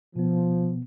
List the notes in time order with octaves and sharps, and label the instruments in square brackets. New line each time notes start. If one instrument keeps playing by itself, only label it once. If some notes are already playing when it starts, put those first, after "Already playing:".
[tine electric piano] B2 B3 [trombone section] F3